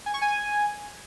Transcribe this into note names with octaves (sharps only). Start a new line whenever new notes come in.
G#5
C#6
G#5